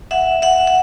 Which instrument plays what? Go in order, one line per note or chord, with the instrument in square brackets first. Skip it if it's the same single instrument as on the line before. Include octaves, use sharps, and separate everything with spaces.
[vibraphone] E5 F#5
E5 F#5
F#5